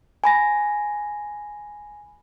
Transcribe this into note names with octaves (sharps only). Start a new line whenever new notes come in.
G#5 B5 A#6